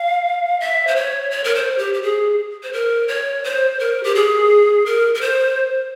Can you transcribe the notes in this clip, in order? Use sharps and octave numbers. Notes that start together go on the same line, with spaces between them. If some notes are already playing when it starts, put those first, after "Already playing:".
Already playing: F5
E5
C5
C#5
C#5
A#4
C5
G4
G4
G#4
C5
A#4
C#5
C5
A#4
G4
G#4
A#4
A#4
C5